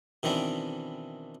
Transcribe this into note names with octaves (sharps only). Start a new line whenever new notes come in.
B2 D#3 E3 C4 D4